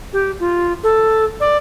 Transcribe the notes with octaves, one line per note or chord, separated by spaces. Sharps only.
G4
F4
A4
D5